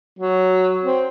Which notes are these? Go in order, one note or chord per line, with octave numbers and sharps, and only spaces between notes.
F#3
C4